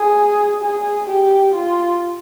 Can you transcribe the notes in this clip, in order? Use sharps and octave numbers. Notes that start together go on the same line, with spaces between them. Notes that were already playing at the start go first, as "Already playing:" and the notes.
Already playing: G#4
G#4
G4
F4